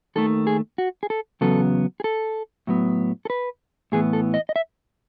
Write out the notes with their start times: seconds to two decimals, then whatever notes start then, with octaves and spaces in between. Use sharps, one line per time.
0.16 D#2 D#3 A3 A4
0.47 G#4
0.78 F#4
1.03 G#4
1.10 A4
1.41 E2 C#3 F#3 B3 A4
2.00 G#4
2.04 A4
2.67 A2 F#3 B3
3.25 A4
3.30 B4
3.92 A2 E3 B3 G#4
4.13 A4
4.34 D#5
4.49 D#5
4.56 E5